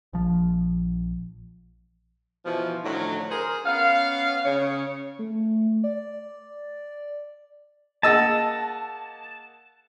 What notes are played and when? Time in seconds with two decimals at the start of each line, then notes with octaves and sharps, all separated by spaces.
0.13 A#1 F3
2.45 B2 E3 F3
2.83 A2 D3 D#3 F3 F#3
3.30 G#4 A#4 C5
3.65 B3 C#4 F5
4.44 C#3 C#5
5.19 A3
5.84 D5
8.03 A#3 G#4 D#5 F#5 A5 E6